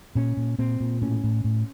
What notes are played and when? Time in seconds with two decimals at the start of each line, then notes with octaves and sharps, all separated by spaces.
0.15 A#2 C#4
0.37 A#2
0.59 A#2 C4
0.80 A#2
1.02 A2 C#4
1.24 A2
1.44 A2